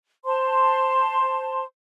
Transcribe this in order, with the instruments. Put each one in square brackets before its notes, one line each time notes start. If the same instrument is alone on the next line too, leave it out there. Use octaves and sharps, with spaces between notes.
[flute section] C5 A5 C6